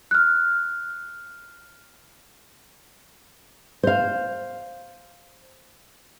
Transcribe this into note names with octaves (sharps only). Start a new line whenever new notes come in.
F6 F#6
C5 F5